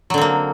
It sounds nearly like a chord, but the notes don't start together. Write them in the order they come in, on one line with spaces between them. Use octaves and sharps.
F#3 D3 C4 A#3